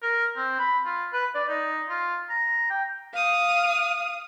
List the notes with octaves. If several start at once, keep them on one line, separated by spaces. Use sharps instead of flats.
A#4
C4
B5
F4
B4
D5
D#4
F4
A#5
G5
F5 D#6